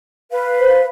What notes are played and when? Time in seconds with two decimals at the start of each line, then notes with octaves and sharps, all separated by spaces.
0.31 B4 F5
0.60 C5